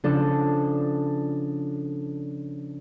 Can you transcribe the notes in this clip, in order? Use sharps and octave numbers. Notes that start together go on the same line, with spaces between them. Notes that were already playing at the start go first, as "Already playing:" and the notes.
C#3 F3 D4 A4